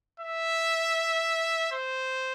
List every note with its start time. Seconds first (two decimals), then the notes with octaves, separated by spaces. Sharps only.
0.20 E5
1.72 C5